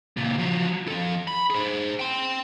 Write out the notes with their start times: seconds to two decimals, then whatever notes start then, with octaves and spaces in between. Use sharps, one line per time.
0.17 C#2 A#2
0.38 F3 F#3
0.88 F3 A4
1.28 B5
1.50 G#4 C5
2.00 G5 C6